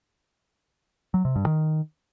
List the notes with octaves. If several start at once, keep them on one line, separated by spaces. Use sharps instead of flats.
F#3
C3
G2
D#3